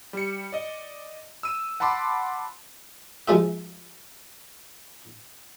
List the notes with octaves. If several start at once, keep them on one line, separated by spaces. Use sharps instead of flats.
G3 C#7
D5 D#5
E6 D#7
F#5 A5 B5 C6 D6
F3 G#3 F4 E5